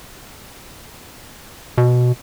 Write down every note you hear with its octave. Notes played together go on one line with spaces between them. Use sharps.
B2